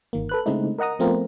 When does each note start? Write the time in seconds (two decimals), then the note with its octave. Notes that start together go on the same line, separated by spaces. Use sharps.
0.13 G1 D#3 A#3
0.29 A4 B4 F#6
0.46 C#3 G#3 A3 C4 D#4 E4
0.78 A#4 D#5 F#5 A#5 D#6
0.99 F3 A3 B3 C4 F4 A#4